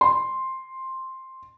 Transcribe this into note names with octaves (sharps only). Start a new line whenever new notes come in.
C6